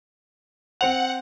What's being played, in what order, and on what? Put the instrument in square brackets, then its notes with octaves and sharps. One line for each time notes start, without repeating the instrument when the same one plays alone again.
[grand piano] C4 C5 F7 [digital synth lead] F#5